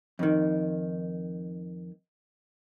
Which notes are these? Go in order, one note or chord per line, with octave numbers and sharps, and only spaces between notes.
F2 D#3